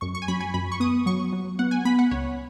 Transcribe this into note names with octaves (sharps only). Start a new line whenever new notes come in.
F#2 C#6
C#6
G#5
F#2 B5
G#5
F#2 B5
C#6
B3 D#6
F#3 C#6
F#3
B3 F#5
G#5
B3 B5
F#5
C#2 C#5